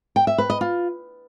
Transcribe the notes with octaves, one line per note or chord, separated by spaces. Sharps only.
G5
E5
B4
D#5
F4